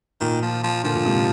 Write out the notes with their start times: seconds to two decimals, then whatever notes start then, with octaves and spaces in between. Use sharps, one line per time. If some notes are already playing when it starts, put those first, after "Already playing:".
0.21 A#2 D#3
0.42 F3
0.64 F3
0.84 A#2 D3 F3
0.96 A#2
1.05 G#2 C3